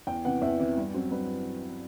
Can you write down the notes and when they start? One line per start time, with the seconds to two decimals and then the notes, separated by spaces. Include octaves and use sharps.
0.07 E2 G5
0.24 C3 E3 B3 F#5
0.42 E2 E5
0.59 C3 E3 B3
0.77 G2
0.94 F#3 C4
1.12 G2 B4